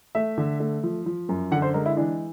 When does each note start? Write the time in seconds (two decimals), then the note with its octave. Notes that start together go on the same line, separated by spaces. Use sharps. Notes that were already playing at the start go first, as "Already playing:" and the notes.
0.15 A3 E5
0.38 D3
0.60 A3
0.83 F3
1.06 F3
1.29 F#2
1.52 D3 F#5
1.62 C5
1.74 G#3 A#4
1.86 E4
1.97 E3 D4